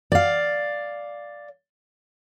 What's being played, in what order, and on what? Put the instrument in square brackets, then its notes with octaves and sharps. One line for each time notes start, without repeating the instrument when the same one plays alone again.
[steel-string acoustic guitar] D5 F5